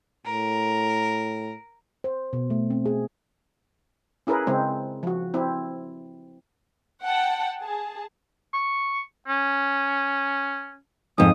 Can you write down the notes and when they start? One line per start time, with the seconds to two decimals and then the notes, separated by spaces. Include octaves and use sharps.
0.27 A2 A#4
2.04 C5
2.33 B2
2.50 A3
2.70 C4
2.86 G#4
4.27 C#4 E4 G#4 A#4 B4
4.47 C#3 G#3 C4
5.03 F3 F#4
5.34 C4 E4
7.03 F#5 G5 A5
7.61 G#4 A5
8.53 C#6
9.27 C#4
11.18 F2 G#2 D#6